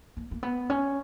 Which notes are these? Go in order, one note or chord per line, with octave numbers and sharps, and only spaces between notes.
A#3
A#3
B3
C#4